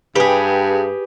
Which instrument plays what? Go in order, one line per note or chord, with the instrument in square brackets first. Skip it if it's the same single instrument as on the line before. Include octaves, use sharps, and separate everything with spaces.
[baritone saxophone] G2 [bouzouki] G4 G#4 [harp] B4